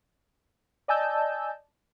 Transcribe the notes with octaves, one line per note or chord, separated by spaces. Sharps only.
D5 D#5 G#5 A5 E6 G6